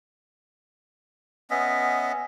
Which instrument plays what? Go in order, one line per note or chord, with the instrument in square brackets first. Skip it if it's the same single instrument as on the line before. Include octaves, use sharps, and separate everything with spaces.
[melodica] B3 C#4 D#5 E5